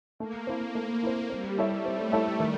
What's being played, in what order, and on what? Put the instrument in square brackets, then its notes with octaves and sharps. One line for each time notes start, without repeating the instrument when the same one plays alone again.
[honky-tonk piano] A3 [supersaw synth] A#3
[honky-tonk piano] C4 E4
A3
C4 E4
[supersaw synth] G3 [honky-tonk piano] C4
[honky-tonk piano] E4 A4 C#5 E5
[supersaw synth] A3 [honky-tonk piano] C4
[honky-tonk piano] E4 A4 C#5 E5
D#3